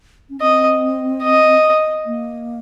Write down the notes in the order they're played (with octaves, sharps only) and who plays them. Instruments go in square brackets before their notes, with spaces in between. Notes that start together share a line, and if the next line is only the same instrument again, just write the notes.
[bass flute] C#4
[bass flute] C4 [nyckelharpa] D#5
[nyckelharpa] D#5
[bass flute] A#3